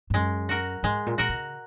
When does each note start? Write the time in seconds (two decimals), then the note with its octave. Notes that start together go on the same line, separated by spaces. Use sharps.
0.10 G#2
0.14 F#2 G#3
0.49 F#4 A#4
0.83 G#2 G#3
1.07 A#2
1.18 A#2 F#4 A#4
1.29 C#3